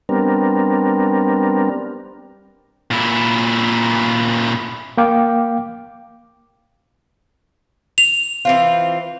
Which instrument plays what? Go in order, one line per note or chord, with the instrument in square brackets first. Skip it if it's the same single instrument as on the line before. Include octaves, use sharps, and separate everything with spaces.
[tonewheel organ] G3 B3 C4 D4 A#4
[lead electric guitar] A#2 E4
[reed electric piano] A#3 F5 G5 D6
[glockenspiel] F7
[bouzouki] E3 C4 F4